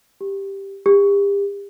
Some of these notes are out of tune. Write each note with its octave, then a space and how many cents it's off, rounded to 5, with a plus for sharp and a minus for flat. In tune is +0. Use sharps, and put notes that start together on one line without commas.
G4 +0
G4 +35